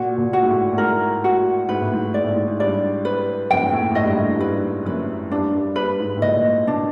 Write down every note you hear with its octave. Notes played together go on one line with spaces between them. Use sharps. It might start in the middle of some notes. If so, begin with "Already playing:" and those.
Already playing: A#2 F#4
A#2
F#4
G#2
A2
A2
G#2 A#4
F#4
G#2 B4
A2
G#2
G#2 D5
A2
G#2
G#2
G2 D5
B4
F#2 G5
G#2
A2
A2 D#5
G2
G#2
A2
G2
G#2 B4
F#2 B4
G2 D4
G2
G2 B4
G#2
A2
A#2 D#5
B2 D4